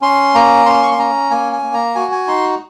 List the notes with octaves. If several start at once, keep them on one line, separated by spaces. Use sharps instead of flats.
C#4 C6
A#3 A#5
C#4 C6
C#6
C6
C#4 A#5
A#3 G#5
G#5
A#3
A#5
F#4 G#5
G#5
D#4 C6